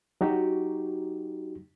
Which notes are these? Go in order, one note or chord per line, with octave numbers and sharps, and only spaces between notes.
F#3 D#4 F#4 G4